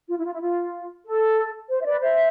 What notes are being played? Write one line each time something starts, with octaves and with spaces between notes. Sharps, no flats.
F4
E4
F4
E4
F4
A4
C5
E5
B4 D5
C5 E5